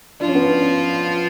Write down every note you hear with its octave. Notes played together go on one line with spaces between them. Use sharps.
F3 D4 F4
C#4
B3
C#4